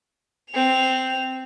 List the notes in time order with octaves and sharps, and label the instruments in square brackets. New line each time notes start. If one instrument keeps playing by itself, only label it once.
[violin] C4 F7